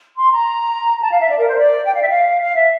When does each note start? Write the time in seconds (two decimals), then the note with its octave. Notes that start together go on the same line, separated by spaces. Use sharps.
0.17 C6
0.31 A#5
1.01 A5
1.10 F5
1.20 E5
1.29 D5
1.39 A#4
1.48 C5
1.57 D5
1.85 G5
1.93 F5
2.01 E5
2.09 F5
2.41 F5
2.56 E5